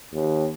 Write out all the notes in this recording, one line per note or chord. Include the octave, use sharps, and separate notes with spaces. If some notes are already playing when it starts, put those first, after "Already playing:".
D#2